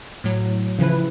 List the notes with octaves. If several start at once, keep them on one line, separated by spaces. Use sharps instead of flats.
A2 F#3
C#3 E3 F3 E4 B4